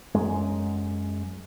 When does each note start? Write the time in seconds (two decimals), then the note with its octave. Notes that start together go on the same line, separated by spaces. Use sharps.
0.14 F#2 G#3